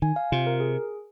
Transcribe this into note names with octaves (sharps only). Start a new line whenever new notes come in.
D#3 G#5
F5
C3 F4
A#4
G#4